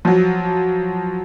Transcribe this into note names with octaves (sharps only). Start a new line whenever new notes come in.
F3 F#3